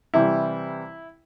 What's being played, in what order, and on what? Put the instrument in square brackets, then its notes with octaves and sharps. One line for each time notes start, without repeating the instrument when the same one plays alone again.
[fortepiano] C3 E3 G3 E4